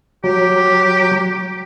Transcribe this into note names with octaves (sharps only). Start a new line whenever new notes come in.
F#3 G4